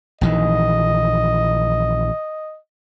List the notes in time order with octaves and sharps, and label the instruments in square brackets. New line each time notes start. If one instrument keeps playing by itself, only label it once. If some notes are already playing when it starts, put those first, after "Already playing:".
[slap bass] A#1 D#3 E3 [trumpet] D#5